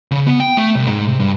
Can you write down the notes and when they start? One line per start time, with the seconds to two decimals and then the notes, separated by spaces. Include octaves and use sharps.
0.11 C#3
0.26 B3
0.40 G5
0.57 A3
0.76 C2
0.88 G#2
1.08 C3
1.20 G2